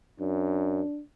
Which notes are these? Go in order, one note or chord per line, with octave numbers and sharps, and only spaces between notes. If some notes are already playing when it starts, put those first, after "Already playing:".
F#2 D4